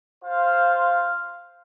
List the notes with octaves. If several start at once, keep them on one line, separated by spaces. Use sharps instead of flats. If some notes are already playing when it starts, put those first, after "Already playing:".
F4 C5 F5